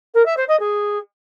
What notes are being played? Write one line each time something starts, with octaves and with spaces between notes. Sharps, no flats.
A#4
E5
C5
D#5
G#4